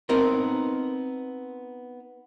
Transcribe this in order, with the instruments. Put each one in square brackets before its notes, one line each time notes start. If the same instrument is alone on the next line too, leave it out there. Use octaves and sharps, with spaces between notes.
[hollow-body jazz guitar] B3 C4 D#4 A#4